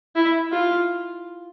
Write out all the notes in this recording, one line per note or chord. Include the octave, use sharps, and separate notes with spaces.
E4
F4